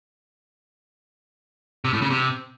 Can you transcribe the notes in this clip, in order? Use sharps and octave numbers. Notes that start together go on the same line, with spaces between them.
C3
A2
C#3
C3